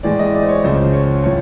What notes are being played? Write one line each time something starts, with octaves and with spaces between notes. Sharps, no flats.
A2 E3 G#3 D5
D#5
D5
C5
C#5
C#2 C#3 F3 C5
C#5
A2 F3 C#5